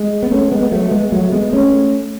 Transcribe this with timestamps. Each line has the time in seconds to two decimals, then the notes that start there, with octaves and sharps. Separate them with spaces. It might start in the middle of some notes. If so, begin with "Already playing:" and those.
Already playing: G#3
0.23 B3
0.31 A3 C#4
0.51 G#3 B3
0.62 B3
0.71 F#3 A3
0.91 G#3 B3
1.12 F#3 A3
1.32 G#3 B3
1.53 A3 C#4